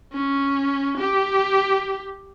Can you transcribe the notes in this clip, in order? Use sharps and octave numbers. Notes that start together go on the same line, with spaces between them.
C#4
G4